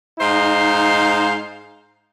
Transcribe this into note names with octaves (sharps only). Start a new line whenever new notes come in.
G#2 D#4 C5 F5